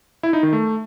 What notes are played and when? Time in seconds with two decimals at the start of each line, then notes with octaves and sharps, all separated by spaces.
0.23 E4
0.33 D#4
0.43 D#3
0.53 A3